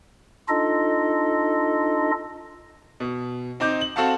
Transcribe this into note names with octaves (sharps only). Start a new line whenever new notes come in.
D4 D#4 F4 A4 D#5
B2
C4 D#4 D6 G6
F#7
C4 F#4 A4 F5 F#5 A5